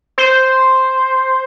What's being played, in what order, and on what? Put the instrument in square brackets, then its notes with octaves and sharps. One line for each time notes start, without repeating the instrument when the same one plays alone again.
[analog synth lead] C5